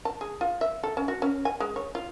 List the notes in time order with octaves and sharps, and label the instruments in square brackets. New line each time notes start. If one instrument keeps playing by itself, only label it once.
[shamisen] A5
G#4
F4
E5
A4
C#4
F#4
C#4
G#5
G#3
C#5
F4